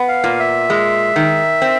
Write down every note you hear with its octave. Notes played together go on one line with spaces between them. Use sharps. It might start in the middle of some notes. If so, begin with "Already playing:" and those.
Already playing: B3
F5
A#2
E5
G#3
D#3
C4